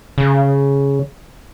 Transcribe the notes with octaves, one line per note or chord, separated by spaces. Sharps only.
C#3